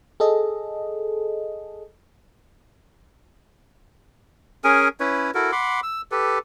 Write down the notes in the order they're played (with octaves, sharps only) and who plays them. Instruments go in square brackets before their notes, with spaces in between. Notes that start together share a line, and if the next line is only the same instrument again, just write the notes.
[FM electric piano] G#4 A4 D#5
[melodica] C#4 G#4 A#4 G#5
C#4 E4 B4 C#5
E4 F#4 A4 A#4
F#5 B5 C6 D6
E6
G4 A4 B4